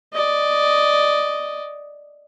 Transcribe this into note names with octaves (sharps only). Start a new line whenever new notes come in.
D5 D#5